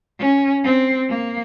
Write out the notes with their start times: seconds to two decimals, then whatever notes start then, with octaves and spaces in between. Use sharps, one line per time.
0.19 C#4
0.64 C4
1.09 A#3